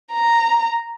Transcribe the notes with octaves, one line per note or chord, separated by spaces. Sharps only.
A#5